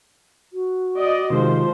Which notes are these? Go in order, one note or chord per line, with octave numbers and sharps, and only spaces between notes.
F#4
D5 D#5
C3 D#3 F3 G#3 C5